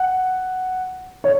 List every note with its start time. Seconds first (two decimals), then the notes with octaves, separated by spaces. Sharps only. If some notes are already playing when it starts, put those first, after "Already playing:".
Already playing: F#5
1.24 C#5